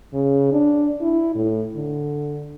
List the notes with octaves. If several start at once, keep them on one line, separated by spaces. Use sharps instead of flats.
C#3
D4
E4
A2
D3